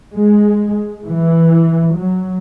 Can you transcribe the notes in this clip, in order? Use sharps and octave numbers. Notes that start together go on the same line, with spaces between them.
G#3
E3
F#3